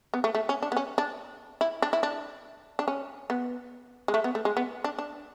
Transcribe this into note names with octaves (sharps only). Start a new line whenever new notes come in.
B3
A3
A3
C#4
D4
B3
C#4
D4
E4
D4
E4
D4
D4
C#4
B3
G#3
A3
B3
A3
G#3
B3
D4
D4